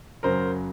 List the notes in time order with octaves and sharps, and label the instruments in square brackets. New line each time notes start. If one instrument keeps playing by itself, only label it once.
[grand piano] F#2 C#3 F#3 A#4 C5